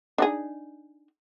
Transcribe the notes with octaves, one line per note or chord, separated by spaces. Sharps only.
D4 D#4 G#4